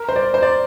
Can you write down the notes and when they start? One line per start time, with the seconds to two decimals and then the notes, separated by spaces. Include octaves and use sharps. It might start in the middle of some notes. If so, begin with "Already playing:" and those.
Already playing: A#4
0.09 C5
0.16 D5
0.34 C5
0.43 D5